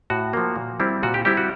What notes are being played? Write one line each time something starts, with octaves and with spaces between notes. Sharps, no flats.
A2 F#4
F3 A#3
A#2
G3 C4 E4
A#2 F#4
G4
G3 C4 E4 G4
F#4